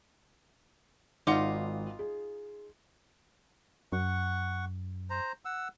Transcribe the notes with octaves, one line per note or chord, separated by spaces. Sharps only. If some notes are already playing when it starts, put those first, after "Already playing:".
G#1 D#4 F4 F#5 C6 D6
G#4
F#2 F#5 C#6
C5 A#5
F#5 E6